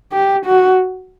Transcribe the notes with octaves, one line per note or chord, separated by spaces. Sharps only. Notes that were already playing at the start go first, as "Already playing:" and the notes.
G4
F#4